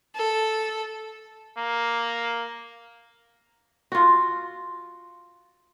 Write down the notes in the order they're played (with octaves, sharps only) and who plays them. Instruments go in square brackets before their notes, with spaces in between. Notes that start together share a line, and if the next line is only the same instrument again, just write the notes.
[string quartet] A4
[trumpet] A#3
[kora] F4 F#4